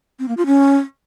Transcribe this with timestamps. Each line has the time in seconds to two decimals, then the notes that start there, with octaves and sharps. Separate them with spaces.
0.19 C4
0.28 A#3
0.37 F4
0.46 C#4